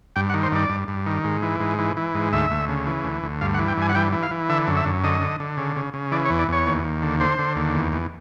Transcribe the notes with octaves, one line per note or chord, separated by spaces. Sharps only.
G2 G5
F#5
D#3
C5
G2 D5
G2
G2
D#3
G#2
E3
G#2
E3
E3
G#2
D2 E5
D2
C#3
E3
D2
D2
G2 F5
F#5
E3
G5
G2 G#5
F#5
E3 G5
E3
F5
E3
D3 E5
F#2
E5
F#2
D3 D#5
D3
D3
C#3
C#3
C#3
E3 D5
C#5
E2
D5
E2 C#5
D#2
D#2
D3
D3 C5
D3
D#2
E2
E2